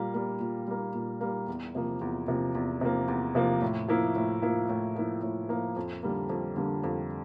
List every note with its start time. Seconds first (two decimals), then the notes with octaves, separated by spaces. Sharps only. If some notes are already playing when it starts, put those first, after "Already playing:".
Already playing: A#2 G3 A#3
0.14 G3 A#3
0.40 A#2
0.67 G3 A#3
0.94 A#2
1.21 G3 A#3
1.48 E2
1.75 C3 F3 A#3
2.01 E2
2.28 C3 F3 A#3
2.55 E2
2.81 C3 F3 A#3
3.08 E2
3.35 C3 F3 A#3
3.62 A2
3.88 F3 A#3 E4
4.16 A2
4.42 F3 A#3 E4
4.69 A2
4.96 F3 A#3 E4
5.23 A2
5.49 F3 A#3 E4
5.76 F2
6.03 D3 G3 A#3
6.30 F2
6.56 D3 G3 A#3
6.84 F2